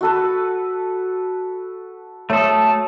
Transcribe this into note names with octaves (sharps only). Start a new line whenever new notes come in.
F#4 A4 B4
A3 A4 C#5 D#6